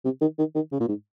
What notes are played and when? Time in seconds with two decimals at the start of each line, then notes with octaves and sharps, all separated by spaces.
0.04 C3
0.21 D#3
0.38 D#3
0.55 D#3
0.72 C#3
0.80 A#2
0.88 G#2